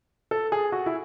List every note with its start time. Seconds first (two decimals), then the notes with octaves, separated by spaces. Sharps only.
0.31 A4
0.52 G#4
0.72 F#4
0.86 E4